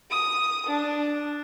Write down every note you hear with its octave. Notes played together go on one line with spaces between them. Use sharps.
D#6
D4